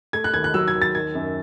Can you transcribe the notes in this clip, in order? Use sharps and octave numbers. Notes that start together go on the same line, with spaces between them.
A3 G#6
F#6
D#2 G#6
F#6
F#3 E6
G#6
D#2
A6
D#3 G#6
F#2